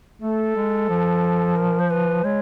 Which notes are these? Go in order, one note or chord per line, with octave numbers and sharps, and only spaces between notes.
A3 A4
G#3
F3
A#4
C5
B4
G#3 C#5